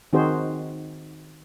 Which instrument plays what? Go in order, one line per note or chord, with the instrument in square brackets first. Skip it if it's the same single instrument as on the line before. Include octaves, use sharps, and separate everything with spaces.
[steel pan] D#3 C4 D#4 F#4 G#4 C5